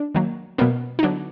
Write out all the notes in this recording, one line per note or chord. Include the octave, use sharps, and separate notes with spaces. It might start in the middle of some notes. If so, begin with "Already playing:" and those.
Already playing: D4
D#3 F#3 A#3
B2 F#3 A#3 B3
D#4
D3 F#3 B3 D4